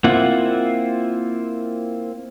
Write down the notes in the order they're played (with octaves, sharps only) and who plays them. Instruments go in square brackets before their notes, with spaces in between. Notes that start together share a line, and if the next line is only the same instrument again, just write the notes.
[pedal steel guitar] A#3 C4 E4 F4 F#5